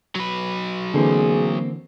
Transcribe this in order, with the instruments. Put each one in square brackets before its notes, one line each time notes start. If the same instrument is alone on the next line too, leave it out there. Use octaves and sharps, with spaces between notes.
[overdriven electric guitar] F#3 B4
[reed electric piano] D3 E3 [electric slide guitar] A#3 C4 [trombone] G#4